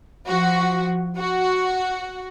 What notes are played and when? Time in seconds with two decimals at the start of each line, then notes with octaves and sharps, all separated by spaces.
0.26 F3 F#4
1.17 F#4